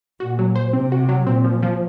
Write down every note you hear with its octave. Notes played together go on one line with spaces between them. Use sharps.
A#2 F#4
F#3
C5
C3 C4
F#4
F#3
A#2 C4
F3
F3